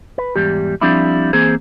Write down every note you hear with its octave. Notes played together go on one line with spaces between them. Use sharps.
B4
E2 G#2 G3 G4
F3 G3 C4 D4 E4
E3 A#3 C4 G#4 C5